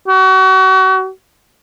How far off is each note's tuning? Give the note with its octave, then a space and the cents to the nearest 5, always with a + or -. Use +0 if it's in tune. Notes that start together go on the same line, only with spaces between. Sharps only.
F#4 +35